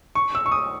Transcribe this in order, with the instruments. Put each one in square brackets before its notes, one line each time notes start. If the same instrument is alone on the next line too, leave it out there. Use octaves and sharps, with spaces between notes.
[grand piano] C#6
E6
C#6
D#6